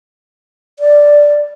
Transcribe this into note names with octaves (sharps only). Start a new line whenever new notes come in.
D5